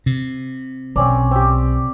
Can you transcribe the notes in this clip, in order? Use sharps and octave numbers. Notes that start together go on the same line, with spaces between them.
C3
B1 C4 C#4 D5
C4 G4